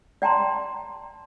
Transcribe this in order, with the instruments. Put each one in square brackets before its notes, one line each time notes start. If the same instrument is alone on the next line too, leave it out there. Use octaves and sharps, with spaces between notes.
[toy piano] D5 G5 A5 A#5 C6